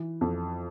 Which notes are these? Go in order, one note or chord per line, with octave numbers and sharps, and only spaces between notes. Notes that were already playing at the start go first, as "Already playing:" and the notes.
Already playing: E3
F2